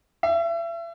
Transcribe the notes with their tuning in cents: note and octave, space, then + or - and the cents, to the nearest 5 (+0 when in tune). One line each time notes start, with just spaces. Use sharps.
E5 +35